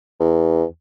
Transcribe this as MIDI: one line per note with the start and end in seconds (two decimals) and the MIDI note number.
0.20 0.64 40